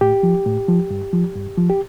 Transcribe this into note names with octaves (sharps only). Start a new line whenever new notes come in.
A2 G4
F3
A2
F3
G2
F3
G2
F3
G4